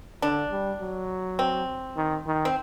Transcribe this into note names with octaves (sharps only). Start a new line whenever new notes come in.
D3 D4
G3
F#3
C4
D#3
D#3
C4